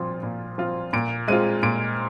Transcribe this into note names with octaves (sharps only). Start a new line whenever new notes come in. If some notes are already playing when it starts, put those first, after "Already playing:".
Already playing: A#2 F3 C4 F4
A#2
F3 C4 F4
A#2 D7
G#3 C4 F4 D#7
A#2 D7